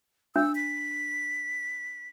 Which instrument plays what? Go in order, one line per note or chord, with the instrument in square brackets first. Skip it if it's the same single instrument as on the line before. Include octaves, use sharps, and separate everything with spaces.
[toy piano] D4 [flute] E6
[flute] B6